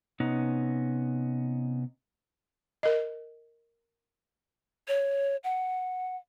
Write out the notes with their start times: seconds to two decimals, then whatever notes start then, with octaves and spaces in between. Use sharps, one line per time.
0.20 C3 B3 C#4 D#4
2.83 A#4 D#5
4.88 C#5
5.44 F#5